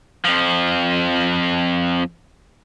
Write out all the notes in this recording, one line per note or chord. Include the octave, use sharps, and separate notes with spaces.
F2 F3